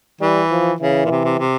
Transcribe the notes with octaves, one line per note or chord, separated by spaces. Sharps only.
E3 G3
F3
C#3 E3
A#2
C3
C3
C3